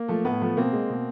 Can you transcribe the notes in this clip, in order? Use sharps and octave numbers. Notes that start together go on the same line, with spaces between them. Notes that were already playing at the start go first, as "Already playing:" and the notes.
Already playing: A#3
F3 A3
A2 B3
F3 A3
B2 A#3 C4
G#3
B2